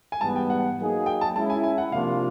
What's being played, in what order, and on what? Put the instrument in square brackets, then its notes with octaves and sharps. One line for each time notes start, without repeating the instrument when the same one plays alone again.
[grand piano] G#5
[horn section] G#2 E3 G3 B3 [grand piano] A5
[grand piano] G5
F#5
[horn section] F#3 A#3 D#4 G#4
[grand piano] G5
A5
[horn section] G#3 C#4 E4 [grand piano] A5
[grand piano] G#5
G#5
F#5
[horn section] C3 F3 A#3 D4 F4 [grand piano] F5